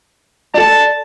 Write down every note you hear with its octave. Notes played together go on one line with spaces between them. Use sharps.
A4 D5 A5